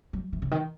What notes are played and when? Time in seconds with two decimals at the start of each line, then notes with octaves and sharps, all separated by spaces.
0.13 F#3
0.33 E3
0.42 C#3
0.51 D#3